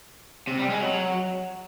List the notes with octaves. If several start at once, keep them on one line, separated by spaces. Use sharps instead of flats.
C3
G3
G#3
F#3